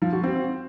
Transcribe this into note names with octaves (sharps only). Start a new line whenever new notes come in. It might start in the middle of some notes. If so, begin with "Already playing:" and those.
F3
F#4
C4